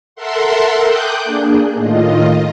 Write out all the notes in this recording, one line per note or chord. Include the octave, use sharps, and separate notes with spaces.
A4 A#4 E5 F#5 C6
G5 D6 D#6 F#6 G6
A#3 D4 G#4
A2 D#3 F4 D#5